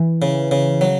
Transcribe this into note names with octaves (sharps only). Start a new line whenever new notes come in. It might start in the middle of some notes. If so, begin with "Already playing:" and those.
Already playing: E3
C#3
C#3
F#3